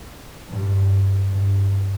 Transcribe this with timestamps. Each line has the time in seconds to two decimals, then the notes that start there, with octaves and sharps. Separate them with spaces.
0.49 G2
1.29 G2